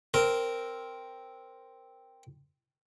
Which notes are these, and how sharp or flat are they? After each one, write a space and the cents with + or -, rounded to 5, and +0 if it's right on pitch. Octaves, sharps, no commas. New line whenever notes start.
C4 +0 A#4 +0